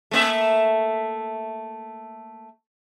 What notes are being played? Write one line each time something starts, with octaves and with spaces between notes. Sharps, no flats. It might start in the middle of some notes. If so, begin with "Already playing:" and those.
A3 A#3 E5